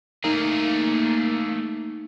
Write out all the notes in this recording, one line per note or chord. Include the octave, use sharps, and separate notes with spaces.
A3 A#3 D#4 G#4